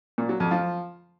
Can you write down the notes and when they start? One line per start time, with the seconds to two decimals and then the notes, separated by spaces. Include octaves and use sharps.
0.18 A#2
0.29 F#3
0.40 F2
0.51 F3